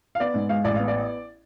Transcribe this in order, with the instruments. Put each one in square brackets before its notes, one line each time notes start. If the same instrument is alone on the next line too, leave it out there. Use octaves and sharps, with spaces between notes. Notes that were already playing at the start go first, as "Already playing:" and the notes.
[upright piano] F5
B3 D5
G#2
G#3 F5
A1 D5
B3 F5
D5